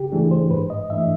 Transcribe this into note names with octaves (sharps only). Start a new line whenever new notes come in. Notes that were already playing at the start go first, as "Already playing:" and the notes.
Already playing: C#3 G4
E3 A3 D4 G#4
C5
G#2 B4
D#5
E3 A3 D4 E5